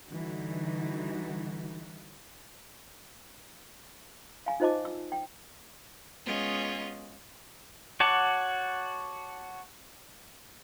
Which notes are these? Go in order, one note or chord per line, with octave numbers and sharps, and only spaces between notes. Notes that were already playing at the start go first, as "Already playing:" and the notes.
D3 E3 G3 D#4 F#4
F5 G#5
D#4 F4 C5 D#5 A5 D6
E6
G5
G#3 B3 C#4 F4 D#5
F#4 C#5 F#5 A5 D6